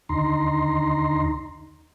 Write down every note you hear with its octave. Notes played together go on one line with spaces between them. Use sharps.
D#2 D3 D#4 A#5 C6